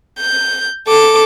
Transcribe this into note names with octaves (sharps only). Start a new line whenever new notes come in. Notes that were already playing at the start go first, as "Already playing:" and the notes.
G6
A4 D6